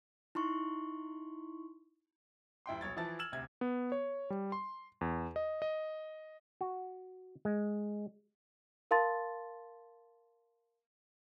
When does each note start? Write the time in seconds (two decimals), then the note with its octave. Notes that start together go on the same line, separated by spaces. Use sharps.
0.35 D#4 E4 C6 C#6
2.66 D#1 E4 G5 C6
2.81 B1 C#5 G#6 A6
2.97 E3 F3 E4 A5 A6
3.19 E6 F6 G#6 E7 F#7
3.32 D2 C3 G#6
3.61 B3
3.92 C#5
4.30 G3
4.52 C6
5.01 E2
5.36 D#5
5.62 D#5
6.61 F#4
7.45 G#3
8.91 A#4 F5 A5 C6 A6